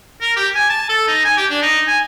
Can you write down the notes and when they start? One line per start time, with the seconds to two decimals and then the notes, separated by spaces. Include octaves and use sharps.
0.21 A#4
0.36 G4
0.55 G#5
0.69 A5
0.89 A4
1.07 D#4
1.25 G#5
1.37 G4
1.50 D4
1.62 D#4
1.87 G#5